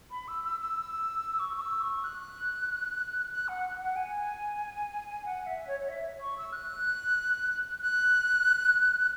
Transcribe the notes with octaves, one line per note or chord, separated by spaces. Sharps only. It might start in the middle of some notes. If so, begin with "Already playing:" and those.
B5
E6
E6
E6
C#6
C#6
E6
C#6
F#6
F#6
F#5
F#5
G#5
F#5
E5
C#5
C#5
E5
C#6
E6
F#6
F#6